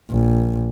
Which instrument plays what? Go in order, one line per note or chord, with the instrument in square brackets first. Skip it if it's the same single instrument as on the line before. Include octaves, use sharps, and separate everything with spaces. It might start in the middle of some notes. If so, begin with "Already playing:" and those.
[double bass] A#1